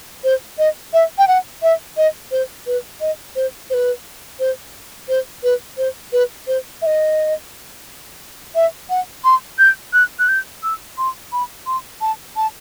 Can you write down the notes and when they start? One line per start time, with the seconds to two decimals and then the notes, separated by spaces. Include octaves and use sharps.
0.24 C5
0.58 D#5
0.93 E5
1.18 G5
1.28 F#5
1.62 E5
1.97 D#5
2.31 C5
2.66 B4
3.01 D#5
3.36 C5
3.70 C5
3.74 B4
4.40 C5
5.09 C5
5.43 B4
5.78 C5
6.13 B4
6.47 C5
6.82 E5
6.86 D#5
8.55 E5
8.90 F#5
9.24 C6
9.59 G6
9.93 F#6
10.19 F#6
10.29 G6
10.63 E6
10.98 C6
11.32 B5
11.66 C6
12.01 A5
12.36 A5